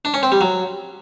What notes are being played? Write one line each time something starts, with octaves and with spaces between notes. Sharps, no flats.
D4
C#4
C4
G3
F#3